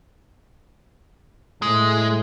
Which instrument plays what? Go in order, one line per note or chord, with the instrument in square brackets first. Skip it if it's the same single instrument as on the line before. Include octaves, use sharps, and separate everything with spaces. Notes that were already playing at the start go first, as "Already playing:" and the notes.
[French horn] A2 [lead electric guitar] G#3